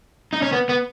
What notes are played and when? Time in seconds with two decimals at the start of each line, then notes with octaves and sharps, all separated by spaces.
0.33 D#4
0.42 C#4
0.52 B3
0.69 B3